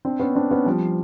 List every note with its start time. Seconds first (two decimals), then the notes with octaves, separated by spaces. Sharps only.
0.05 C4 D4
0.20 B3 C#4
0.35 C4 D4
0.51 B3 C#4
0.66 F3 G3